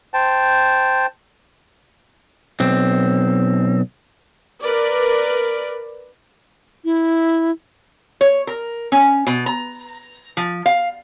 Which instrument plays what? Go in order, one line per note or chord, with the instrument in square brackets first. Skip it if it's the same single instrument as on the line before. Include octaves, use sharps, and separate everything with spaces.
[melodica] C5 G5 A5
[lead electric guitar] B1 C4
[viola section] A#4 B4 D5
[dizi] E4
[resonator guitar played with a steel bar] C#5
A#4
C#4
B2
A#5
F3
F5